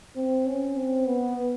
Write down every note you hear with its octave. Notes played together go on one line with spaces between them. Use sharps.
C4
C#4
C4
B3